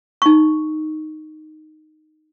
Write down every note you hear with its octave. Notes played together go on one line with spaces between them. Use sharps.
D#4 C#6